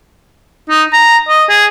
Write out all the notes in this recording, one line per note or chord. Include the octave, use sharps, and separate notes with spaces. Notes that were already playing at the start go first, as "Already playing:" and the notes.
D#4
A#5
D#5
G#4